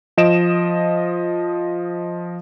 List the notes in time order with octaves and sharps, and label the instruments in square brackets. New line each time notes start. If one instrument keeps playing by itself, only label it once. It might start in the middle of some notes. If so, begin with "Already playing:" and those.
[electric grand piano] F3 D#5 D7 E7